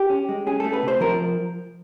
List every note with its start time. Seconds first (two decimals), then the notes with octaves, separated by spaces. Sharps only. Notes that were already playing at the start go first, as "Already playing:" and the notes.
Already playing: G4
0.10 C#4
0.29 G#3
0.47 C#4 G#4
0.60 A3 A4
0.73 B4
0.83 C3
0.88 C5
1.00 F3 A#4